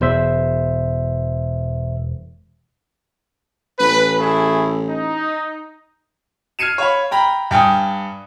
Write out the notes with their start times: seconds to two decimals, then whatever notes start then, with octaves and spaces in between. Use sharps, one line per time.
0.01 E1 E2 C5 E5
3.80 A1 B4
4.19 A3 E4 G#4
4.89 D#4
6.59 F6 G#6 C7 C#7 D#7 E7
6.78 C#5 F5 B5
7.11 G5 A#5 B5
7.51 G2 G5 G#5 D#6